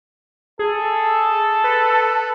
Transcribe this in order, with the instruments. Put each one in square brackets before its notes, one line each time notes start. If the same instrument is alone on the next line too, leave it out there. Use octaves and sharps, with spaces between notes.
[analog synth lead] G#4 [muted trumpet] A4
[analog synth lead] B4